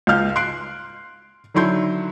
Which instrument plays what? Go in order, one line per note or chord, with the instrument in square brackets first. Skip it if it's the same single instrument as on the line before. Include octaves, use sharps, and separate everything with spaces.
[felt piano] C#2 F4 F5 F6 G6
C6 F#6 C7 D7
D3 D#3 F#3 E4 C6 G6